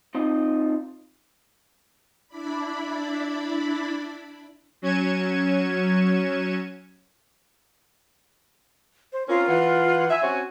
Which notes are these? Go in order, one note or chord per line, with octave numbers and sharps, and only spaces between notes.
C4 D#4 F4 D#5
D4 E4 D5 B5
F#3 C#4 G#6 C#7 D#7 E7
C5
C4 C#4 F4 A#4
E3 F#5
E5 G#5
C4 C#4 F#4